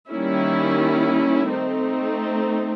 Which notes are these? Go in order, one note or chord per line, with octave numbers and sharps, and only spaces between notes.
D#3 G3 A#3 C#4 E4
A3 C4 D#4